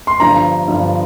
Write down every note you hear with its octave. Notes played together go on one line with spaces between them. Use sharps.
C6
G1 G2 F3 A#5
G1 G2 F3